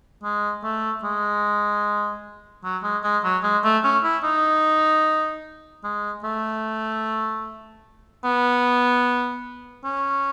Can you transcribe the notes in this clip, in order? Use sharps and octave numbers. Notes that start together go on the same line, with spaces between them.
G#3
A3
G#3
F#3
G#3
G#3
F#3
G#3
A3
C#4
E4
D#4
G#3
A3
B3
C#4